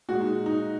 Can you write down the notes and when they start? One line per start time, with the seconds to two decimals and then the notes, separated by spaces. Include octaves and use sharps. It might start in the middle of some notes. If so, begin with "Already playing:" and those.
0.09 A#2 G#3 F#4
0.21 D#4
0.46 D#4